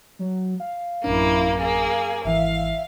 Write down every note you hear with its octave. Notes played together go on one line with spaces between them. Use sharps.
F#3
F5
A1 F#2 A#3 D4 E4
A#3 G#4
G#1 E3 E5 F5